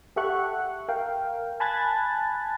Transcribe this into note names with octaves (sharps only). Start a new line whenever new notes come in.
G4 A4 E5 F#5 C#6 F#6
A#4 F5 G5
G#5 A5 B5 F#6 G#6 A6